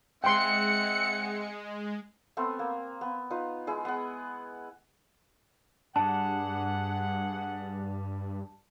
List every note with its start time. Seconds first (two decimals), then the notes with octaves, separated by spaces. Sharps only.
0.24 G#3 C4 E5 F#5 G5 C6 C#7
2.37 A3 B3 C4 C6
2.59 A#3
3.01 B3
3.30 D#4 F4 B4
3.67 G#3 E4 G#4
3.85 B3 F#5
5.96 G2 G3 D4 G#4 F#5 A5